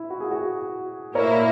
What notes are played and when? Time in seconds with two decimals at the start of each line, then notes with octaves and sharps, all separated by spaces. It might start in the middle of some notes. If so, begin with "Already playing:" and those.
Already playing: E4
0.10 F#4
0.20 G#4
0.31 F#4
1.15 A#2 A#3 E4 A#4 C#5